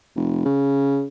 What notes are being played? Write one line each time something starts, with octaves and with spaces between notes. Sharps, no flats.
F1
C#3